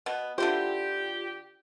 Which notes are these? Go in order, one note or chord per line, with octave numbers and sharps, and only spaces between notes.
B2 B3
D3 E4 F4 G4 C5